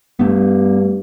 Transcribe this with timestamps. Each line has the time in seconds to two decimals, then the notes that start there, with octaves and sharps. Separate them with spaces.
0.19 G2 A3 B3